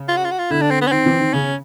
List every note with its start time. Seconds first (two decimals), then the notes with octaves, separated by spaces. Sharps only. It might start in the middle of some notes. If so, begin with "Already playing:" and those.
Already playing: C#3
0.09 F4
0.17 F#4
0.25 F4
0.31 F#4
0.39 F4
0.50 D3 E4
0.61 D4
0.71 C4
0.81 B3
0.87 C#4
0.92 D#3 C4
1.06 E3
1.20 D#3
1.33 C#3 C#4